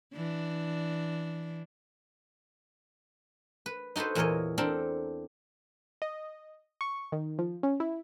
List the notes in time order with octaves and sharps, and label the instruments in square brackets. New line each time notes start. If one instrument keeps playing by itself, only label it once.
[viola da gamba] E3 D4
[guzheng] B4
D#4 F#4 A4 B4 C5
E2 A#2 E3 A#4 C#5 D#5
C4 D4 A4 A#4
[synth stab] D#5
C#6
D#3
F3
C#4
E4